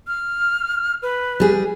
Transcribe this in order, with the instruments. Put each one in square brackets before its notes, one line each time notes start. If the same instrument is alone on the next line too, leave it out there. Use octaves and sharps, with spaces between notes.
[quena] F6
B4
[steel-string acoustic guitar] G3 G#4